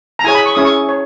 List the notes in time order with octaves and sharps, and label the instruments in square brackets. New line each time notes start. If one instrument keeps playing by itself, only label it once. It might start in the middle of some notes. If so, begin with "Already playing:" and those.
[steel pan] A#5
E4 G#4 C#5 G#5
B5
C#6
C#4 E4 G#4 C#5 D#6
C#6
C#5